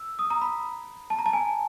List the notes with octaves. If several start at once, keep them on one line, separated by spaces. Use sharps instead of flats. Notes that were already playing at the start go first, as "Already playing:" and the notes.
Already playing: E6
D#6
A#5
B5
A5
A#5
A5
G#5